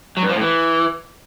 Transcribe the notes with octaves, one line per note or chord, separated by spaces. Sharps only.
F#3
G2
F3
A2
E3